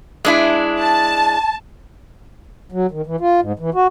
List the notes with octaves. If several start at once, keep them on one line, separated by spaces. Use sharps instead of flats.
G#3 D4 E4
A5
F#3
D#3
E3
F4
G#2
E3
F#4